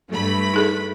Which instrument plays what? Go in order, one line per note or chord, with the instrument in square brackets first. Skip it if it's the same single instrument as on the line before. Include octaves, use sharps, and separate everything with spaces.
[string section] G2 A3 B5
[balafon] D#4 G#4 A4